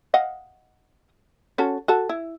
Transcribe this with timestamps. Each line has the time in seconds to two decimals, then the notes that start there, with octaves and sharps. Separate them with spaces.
0.14 D#5 F5 F#5
1.58 C#4 F#4 A4
1.88 F#4 A4
2.09 E4